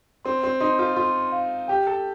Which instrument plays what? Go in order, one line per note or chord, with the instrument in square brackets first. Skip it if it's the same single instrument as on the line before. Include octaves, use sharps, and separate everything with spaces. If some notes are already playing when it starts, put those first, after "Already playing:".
[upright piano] C4 [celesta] C6
[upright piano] C4
[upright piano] D#4 [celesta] C6
[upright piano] F4
[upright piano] F4 [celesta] C6
[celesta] F5
[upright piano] G4 [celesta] G5
[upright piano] A4